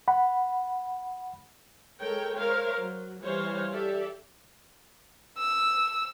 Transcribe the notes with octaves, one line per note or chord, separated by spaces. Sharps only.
F#5 B5
G#3 A4 A#4 C#5 G5
A#4 C5 C#5 F5
F#3
E3 G3 C5 C#5 F5
G4 A4 D5 E5
E6